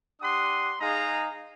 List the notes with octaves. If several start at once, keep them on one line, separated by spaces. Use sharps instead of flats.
D4 G4 F#5 C6 D#6
G#3 D#4 G#4 F5 A#5 D#6